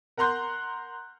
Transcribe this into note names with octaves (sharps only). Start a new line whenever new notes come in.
A#4 F#5 A#5 C6 F#6 G6